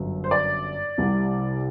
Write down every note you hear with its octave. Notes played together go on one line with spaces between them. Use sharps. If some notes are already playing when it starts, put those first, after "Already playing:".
Already playing: G1 F#2 F#3
C5
D5
C2 C3 G3